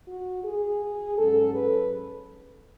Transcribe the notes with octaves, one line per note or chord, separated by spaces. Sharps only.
F#4
G#4
G#2 F#3 C#4 A4
B4